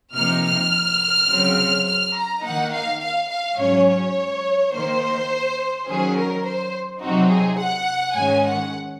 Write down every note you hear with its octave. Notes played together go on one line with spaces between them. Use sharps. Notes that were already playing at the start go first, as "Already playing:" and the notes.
C3 F3 A#3 D#4 F6
F6
C#3 F#3 C4
F6
A#5
D#3 A#3 D#4 F#5
F5
F5
F5
G#2 F#3 C#4 C#5
C#5
D#3 A#3 D#4 C5
D#3 F#3 C#4 G#4
A#4
C5
C3 F#3 C4 D#4 F#4
G#4
F#5
G#2 D#3 G#3 C#4 G#5
F#5